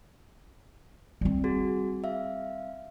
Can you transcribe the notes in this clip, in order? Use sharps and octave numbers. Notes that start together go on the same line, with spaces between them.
G3 C4
F#4 G#4
E5 F5